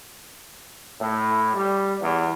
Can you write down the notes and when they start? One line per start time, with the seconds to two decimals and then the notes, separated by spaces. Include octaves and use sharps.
1.00 A2
1.53 G3
2.01 E2